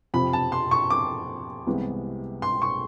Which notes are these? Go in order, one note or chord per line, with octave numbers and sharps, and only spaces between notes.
F2 C3 F3 B5
A5
C6
C#6
D6
C2 C3 E3 G#3 B3
C6
C#6